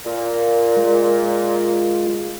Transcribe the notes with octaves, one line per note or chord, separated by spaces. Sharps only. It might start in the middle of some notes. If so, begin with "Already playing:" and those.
A#2
G#3 F4